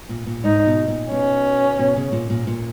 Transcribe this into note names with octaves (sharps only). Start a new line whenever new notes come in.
A#2
A#2
G#2 D#4
B2
A#2
B2 C#4
B2
C#3
A#2
A#2
A#2